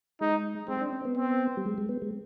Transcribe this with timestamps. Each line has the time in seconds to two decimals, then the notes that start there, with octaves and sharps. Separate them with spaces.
0.21 G#3 D#4
0.68 G#3 C4
0.81 D4
0.93 C4
1.05 B3
1.17 C4
1.57 G3
1.66 G#3
1.78 G#3
1.89 B3
2.02 G#3